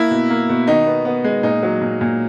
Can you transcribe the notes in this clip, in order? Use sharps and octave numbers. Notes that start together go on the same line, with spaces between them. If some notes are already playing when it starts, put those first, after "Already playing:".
Already playing: A#3 E4
B2
A#3
B2
D#3 D#4
B3
B3
G#3
A#2 D#4
F#3
A#2
A#2